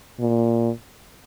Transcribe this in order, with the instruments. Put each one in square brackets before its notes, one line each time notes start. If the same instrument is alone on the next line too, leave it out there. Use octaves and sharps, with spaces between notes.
[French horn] A#2